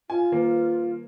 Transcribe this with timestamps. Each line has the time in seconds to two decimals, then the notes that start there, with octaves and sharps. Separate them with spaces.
0.10 F4 G#5
0.32 D#3 A#3